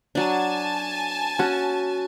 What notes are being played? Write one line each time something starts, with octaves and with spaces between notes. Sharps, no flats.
F#3 D4 G#5 A5
C#4 F#4